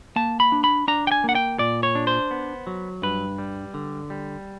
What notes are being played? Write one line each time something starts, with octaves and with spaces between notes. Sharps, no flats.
A#3 A5
B5
D4
B5
D4 A#5
G5
G#5
A#3 F#5
G5
A#2 D5
C#5
D4
C5
B3
F#3
G2 B4
G3
D3
G3